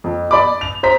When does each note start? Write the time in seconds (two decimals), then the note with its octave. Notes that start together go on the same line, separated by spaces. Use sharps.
0.04 F2
0.31 D5 B5 D6
0.61 F7
0.83 C5 A#5 B6